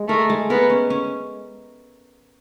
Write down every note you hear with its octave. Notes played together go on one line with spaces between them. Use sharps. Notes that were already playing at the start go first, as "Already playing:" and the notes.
Already playing: G#3
A3 A#4
G#3
B3 A#4
C#4
C#4